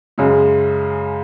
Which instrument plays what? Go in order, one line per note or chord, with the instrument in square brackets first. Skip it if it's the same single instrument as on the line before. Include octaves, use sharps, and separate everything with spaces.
[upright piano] F#2 C#3 G#3